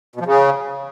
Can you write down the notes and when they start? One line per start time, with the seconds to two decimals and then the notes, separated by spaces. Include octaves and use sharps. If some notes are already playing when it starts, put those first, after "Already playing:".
0.16 B2
0.21 F3
0.26 C#3